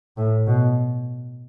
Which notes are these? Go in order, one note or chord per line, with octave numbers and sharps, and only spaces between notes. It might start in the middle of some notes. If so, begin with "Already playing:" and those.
A2
B2